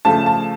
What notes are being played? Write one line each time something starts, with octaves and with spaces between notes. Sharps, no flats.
C#3 F3 A3 A5
A5